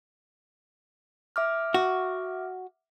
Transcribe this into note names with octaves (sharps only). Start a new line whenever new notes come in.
E5 D6 F6
F#4